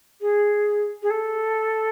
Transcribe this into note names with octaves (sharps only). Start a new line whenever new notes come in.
G#4
G#4
A4